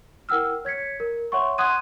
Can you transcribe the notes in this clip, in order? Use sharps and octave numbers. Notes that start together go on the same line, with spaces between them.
E4 A#4 F#5 G5 E6 F6
C#5 G#6 B6 C#7
A#4
C#5 E5 F#5 C6 C#6
F#5 C6 D#6 F#6 G#6 D#7